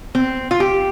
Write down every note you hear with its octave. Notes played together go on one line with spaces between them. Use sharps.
C4
F4
G4